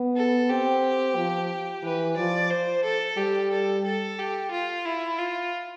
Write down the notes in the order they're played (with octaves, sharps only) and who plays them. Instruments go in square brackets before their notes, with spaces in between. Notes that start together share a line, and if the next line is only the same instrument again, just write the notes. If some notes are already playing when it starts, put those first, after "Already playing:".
Already playing: [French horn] B3
[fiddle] A4
[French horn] C4 [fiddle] G4
[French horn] F3
[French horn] E3 [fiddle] B4
[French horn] F3 [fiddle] D5
[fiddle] C5
A4
[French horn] G3 [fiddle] G4
[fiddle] A4
A4
G4
F4
E4
F4